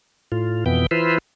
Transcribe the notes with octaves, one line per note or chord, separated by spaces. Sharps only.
A2 F4
F2 B2 E3 B3 G5
E3 E4 F4 B4 C5